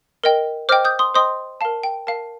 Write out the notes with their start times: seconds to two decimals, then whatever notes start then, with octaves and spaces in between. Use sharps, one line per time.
0.24 A#4 D#5 G5
0.69 C5 D#5 G5 D6 F6
0.85 D#6 G6
0.99 C6 D#6
1.14 C5 D#5 G5 C6 D#6
1.61 A#4 F5 A5
1.83 G5
2.07 A#4 F5 A5